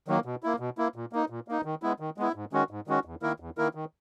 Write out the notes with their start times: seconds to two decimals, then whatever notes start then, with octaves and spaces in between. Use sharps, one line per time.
0.08 D#3 F#3 A#3
0.25 B2
0.43 A#3 E4
0.60 B2
0.78 A#3 E4
0.96 A#2
1.13 A#3 D#4
1.30 A#2
1.48 A#3 D#4
1.65 D#3
1.82 G#3 B3 E4
2.00 D#3
2.18 G#3 B3 E4
2.35 G#2
2.53 D#3 G#3 C#4 F#4
2.70 G#2
2.87 D#3 G#3 C#4 F#4
3.05 E2
3.22 D#3 A#3 E4 A#4
3.40 E2
3.58 D#3 A#3 E4 A#4
3.75 D#3